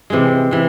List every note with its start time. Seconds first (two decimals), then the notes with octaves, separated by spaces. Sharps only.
0.10 C3 E3 G#3
0.51 C3 E3